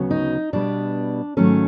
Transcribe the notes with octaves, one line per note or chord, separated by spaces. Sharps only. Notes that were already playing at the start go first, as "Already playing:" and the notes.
Already playing: D2 C#3 F#3 B3
D#4
B2 G3 B3 D4
G#2 D#3 F#3 A3 C#4